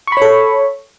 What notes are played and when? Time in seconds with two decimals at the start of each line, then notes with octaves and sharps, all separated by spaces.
0.07 C#6
0.12 B5
0.17 C#5
0.22 A4